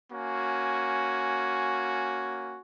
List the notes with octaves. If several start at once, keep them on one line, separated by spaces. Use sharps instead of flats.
A#3 C#4 F#4 G#5